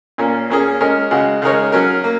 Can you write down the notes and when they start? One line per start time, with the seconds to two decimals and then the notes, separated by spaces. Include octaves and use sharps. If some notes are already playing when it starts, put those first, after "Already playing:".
0.18 A#2 A#3 C#4
0.50 A#2 A#3 C#4 G#4
0.81 G#3 C#4 A#4
1.11 C#3 G#3 F#4
1.42 C#3 G#3 D#4 A#4 C#5
1.72 F#3 C#4 A#4
2.04 A#3